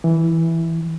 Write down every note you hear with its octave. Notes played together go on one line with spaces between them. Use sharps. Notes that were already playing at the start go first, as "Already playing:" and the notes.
E3